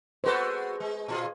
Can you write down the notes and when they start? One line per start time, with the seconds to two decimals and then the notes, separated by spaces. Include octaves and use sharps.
0.24 G#3 F#4 A4 B4 C5
0.80 G#3
1.08 A#2 F4 G#4